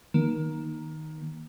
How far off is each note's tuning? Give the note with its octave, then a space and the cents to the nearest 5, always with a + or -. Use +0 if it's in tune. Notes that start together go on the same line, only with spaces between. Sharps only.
D#3 +0 A#3 +25